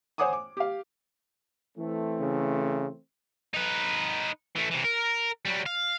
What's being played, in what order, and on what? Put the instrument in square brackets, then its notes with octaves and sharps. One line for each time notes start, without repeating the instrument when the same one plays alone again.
[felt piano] C5 C#5 F#5 G#5 D6 D#6
D6
G4 F5
[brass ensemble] E3 A3 C4
[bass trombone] C#3
[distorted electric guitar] D#4 B4
E3 A3
C3 E3
A#4
F#3 G3
F5